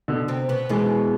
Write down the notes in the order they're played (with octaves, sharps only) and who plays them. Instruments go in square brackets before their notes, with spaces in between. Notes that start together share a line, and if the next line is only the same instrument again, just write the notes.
[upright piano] B2 D3
[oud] C3 C4
B2 B3
[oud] B2 B3 [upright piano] E3 G#3